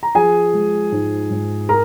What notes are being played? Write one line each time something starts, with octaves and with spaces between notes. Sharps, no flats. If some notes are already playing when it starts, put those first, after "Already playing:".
A#5
F3 G#4 G#5
G#3
G#2
G#2
A#4 A#5